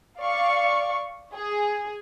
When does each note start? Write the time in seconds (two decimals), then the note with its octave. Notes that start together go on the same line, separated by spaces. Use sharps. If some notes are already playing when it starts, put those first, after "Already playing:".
0.21 D5 F5 C#6
1.35 G#4